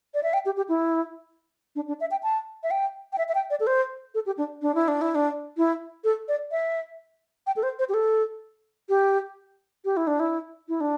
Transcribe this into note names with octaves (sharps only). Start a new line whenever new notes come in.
D5
E5
G5
G4
G4
E4
D4
D4
E5
G5
A5
E5
G5
G5
E5
E5
G5
D5
A4
C5
A4
G4
D4
D4
E4
D4
E4
D4
E4
A4
D5
E5
G5
A4
C5
C5
G4
A4
G4
G4
E4
D4
E4
E4
D4